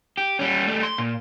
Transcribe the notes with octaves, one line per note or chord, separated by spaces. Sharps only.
G4
G3 C#4
G3 A3
C6
A#2